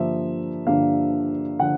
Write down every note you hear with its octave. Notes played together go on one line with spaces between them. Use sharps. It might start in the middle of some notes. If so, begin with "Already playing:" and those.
Already playing: G2 D3 F3 A#3 E5
G2 D3 F3 A#3 F5
D3 F3 F#5